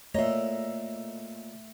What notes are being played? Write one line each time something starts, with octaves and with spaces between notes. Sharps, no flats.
A#2 A3 C#5 D#5 E5 A#5